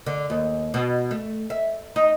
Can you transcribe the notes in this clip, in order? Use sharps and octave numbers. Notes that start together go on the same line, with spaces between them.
D3
D#2
B2
A3
E5
D#4